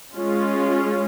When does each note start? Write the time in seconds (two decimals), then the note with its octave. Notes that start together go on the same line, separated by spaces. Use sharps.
0.13 G#3 C#4 F4